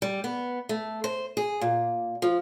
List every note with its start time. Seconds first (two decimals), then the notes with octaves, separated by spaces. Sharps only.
0.02 G3
0.24 B3
0.69 A3
1.04 C5
1.37 G#4
1.61 A#2
2.22 F3